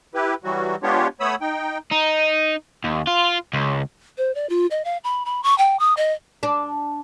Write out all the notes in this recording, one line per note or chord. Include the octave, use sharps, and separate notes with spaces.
E4 G4 B4
E3 F#3 G3 F#4
G#3 B3 D4 F4 G4 C#5
A3 B3 C#5 B5 D#6 E6
D#4 G5
D#4
D#2
F4
C#2
C5
D5
F4
D#5
F5
B5
B5
C#6
G5
D#6
D#5
D4